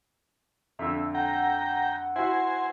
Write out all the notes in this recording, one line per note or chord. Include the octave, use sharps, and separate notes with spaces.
F2 D3 E5
F#5 G5 A#5
E4 F#4 C5 G#5